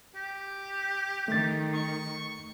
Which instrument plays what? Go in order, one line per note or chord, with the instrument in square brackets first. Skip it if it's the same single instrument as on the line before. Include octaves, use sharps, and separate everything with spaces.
[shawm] G4
[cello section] D#3 [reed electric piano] A3 A6
[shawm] C#6